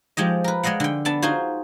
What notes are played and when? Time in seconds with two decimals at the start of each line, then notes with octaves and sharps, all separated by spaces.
0.17 F3 G#3 G4 D#5
0.44 A#4 B4
0.63 G#3 D5 D#5 F5 F#5
0.80 D3 G5
1.05 B3 D4 A5
1.22 D#4 F4 F#4 G#4 C5